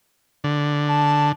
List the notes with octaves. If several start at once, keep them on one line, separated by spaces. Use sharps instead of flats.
D3
A5